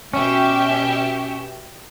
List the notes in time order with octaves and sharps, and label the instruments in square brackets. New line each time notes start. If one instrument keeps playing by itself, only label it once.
[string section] B2 G4 E5 [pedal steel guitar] C#4